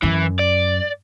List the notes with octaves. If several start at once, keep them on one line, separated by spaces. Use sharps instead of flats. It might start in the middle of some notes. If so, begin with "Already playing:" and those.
F#2 E3
D5